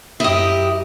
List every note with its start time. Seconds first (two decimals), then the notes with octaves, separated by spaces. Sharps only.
0.20 F#2 E4 G4 D#5 D#6